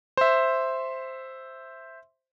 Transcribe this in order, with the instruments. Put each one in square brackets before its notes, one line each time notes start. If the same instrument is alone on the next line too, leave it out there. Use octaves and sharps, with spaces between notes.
[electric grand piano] C5 E5